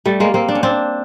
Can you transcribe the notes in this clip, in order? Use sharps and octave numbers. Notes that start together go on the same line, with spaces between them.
G3 A3
G#3 A#3
A#3 C4
D4
C#4
C4 D4